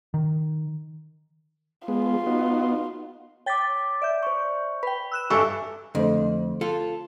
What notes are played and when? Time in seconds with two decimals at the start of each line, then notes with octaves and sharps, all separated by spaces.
0.14 D#3
1.88 G#3 B3 F4
2.26 B3 D#4 F#4
3.46 C#5 G5 D6 A6 B6
4.02 D5 E5 G6
4.23 C5 C#6
4.83 B4 G5 B5
5.12 E6 F#6 E7
5.30 G2 G4 A4 E5 G#5 C#6 E6
5.95 F2 D3 A3 C5
6.61 F4 A4